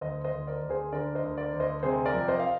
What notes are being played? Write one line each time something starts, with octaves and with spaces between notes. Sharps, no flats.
D2 C5 D#5
C5 D#5
D2
A#4 D5
D2
G#4 C5
D3 A#4 D5
C5 D#5
D2
A#4 D5
D2
C5 D#5
C3 G#4 C5
A#4 D5
F2
C5 D#5
F5